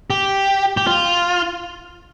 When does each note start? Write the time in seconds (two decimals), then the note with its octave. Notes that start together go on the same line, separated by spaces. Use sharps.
0.10 G4
0.77 G4
0.87 F4